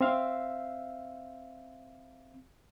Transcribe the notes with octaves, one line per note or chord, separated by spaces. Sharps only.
C4 E5 F5